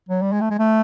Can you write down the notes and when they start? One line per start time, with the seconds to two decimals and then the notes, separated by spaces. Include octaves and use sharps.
0.09 F#3
0.22 G3
0.32 G#3
0.41 A3
0.50 G#3
0.59 A3